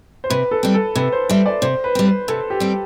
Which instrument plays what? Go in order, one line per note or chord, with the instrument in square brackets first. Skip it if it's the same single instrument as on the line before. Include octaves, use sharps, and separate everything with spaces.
[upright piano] C5
[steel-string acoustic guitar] C3 [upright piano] B4
[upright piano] A4
[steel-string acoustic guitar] G3 C4
[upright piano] A4
[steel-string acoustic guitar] C3 [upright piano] B4
[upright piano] C5
[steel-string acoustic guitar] G3 C4 [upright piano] E5
[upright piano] D5
[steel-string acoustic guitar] C3 [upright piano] C5
[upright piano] B4
[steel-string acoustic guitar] G3 C4
[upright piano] B4
[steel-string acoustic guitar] C3 [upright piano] A4
[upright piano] G4
[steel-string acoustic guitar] G3 C4